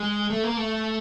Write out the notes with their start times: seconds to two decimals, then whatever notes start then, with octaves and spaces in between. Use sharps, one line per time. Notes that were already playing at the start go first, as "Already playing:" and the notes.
Already playing: G#3
0.30 A3
0.44 A#3
0.57 A3